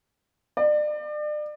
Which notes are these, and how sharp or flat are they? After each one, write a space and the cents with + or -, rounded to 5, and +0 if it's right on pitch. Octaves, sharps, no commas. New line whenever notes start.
D5 +35